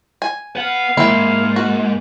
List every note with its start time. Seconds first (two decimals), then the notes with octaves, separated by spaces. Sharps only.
0.22 G#5
0.56 B4 F5 F#5
0.97 D#2 G#2 A#3 C4 E4
1.56 F#4